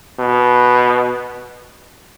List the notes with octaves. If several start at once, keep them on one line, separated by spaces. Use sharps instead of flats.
B2